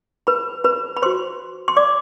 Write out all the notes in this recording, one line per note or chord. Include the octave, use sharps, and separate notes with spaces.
B4 B5
B4 B5
B5
F#4 B4 C5 C6
C6
D5 D6